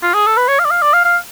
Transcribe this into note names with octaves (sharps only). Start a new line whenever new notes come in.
F4
G#4
A4
B4
C#5
F5
D5
F5
D5
F5
F5